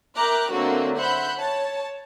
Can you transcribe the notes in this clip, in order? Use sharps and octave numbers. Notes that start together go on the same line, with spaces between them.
A#4 E5 G5 A#5 D6 F#6
D3 F#3 A3 A#3 C4 F#4
C5 E5 F#5 B5 F#6 G6
C#5 A5